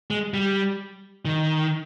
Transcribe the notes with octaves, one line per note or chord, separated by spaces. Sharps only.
G#3
G3
D#3